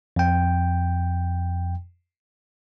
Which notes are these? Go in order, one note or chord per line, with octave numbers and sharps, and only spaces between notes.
F2 G5